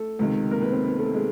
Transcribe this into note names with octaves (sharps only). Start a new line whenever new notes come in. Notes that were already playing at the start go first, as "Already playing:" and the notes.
Already playing: A3 A4
C#2 C3 D#3
A#3 A#4
B3 B4
C4 C5
B3 B4
A3 A4
G#3 G#4